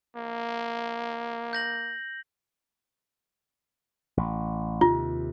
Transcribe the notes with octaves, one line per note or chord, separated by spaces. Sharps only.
A#3
G6 A#6 F#7
A1
D#2 C3 F4